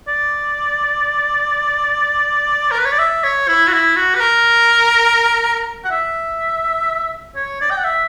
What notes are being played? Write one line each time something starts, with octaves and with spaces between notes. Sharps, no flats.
D5
A#4
B4
C#5
D5
E5
C#5
E4
F#4
E4
F#4
B4
A#4
F#5
E5
C#5
D5
G5
F#5
E5